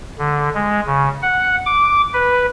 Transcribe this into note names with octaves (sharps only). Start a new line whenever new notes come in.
D3
G#3
C#3
F#5
D6
B4